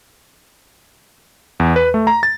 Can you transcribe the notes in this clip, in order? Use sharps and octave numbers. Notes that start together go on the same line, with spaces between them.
E2
B4
A3
A#5
A6